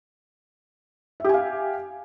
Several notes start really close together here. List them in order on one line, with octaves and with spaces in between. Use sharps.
E5 G4 G#5 F5